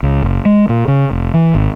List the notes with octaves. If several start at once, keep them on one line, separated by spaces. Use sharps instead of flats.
C#2
F#1
G#3
A#2
C#3
F1
E3
G#1